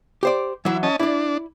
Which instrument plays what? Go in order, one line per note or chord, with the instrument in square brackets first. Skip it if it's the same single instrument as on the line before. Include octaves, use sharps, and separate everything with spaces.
[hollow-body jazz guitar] G4 C5 D5
[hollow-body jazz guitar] E3 F#3 [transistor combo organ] E4
[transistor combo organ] C#4 D#5 A5
[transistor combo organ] D4 [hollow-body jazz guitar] E4 D5